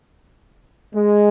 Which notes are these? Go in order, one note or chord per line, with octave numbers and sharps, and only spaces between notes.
G#3